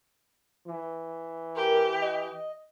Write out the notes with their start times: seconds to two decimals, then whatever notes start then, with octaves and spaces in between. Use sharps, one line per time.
0.67 E3
1.55 G4 A#4
2.01 D#5